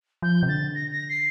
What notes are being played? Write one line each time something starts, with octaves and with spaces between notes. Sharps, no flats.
F3 G6
C3
D3 A6
A#6
A#6
C7